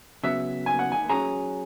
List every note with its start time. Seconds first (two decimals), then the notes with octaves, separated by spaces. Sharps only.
0.23 C#3 F#3 B3 E5
0.66 G#5
0.79 F#5
0.92 G#5
1.09 F#3 C#4 G#4 A#5